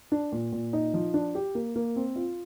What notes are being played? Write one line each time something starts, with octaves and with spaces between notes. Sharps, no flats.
D4
A#2
A#2
D#4
F3
D4
G4
A#3
A#3
C4
F4